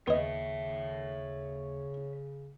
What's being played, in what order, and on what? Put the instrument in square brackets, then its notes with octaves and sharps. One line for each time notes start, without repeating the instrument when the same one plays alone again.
[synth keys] D#2 [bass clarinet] C#3 [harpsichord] B3 D#5 [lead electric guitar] C#5 E5